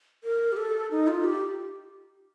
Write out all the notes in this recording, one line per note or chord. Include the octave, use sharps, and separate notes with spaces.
A#4
G4
A4
D#4
F4
G4